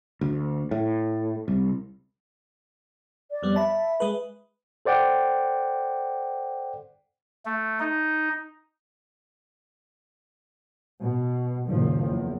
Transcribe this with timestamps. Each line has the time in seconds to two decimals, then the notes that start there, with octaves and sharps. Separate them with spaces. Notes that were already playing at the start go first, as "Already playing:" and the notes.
0.21 D2
0.71 A2
1.48 C2
3.31 D5
3.43 F2 G3 B3
3.56 E5 A5 B5
4.00 G#3 G#4 B4
4.85 A4 C5 D5 F#5 G5
7.45 A3
7.80 D#4
11.01 B2
11.67 F#1 A#2 D#3 F3
12.05 E2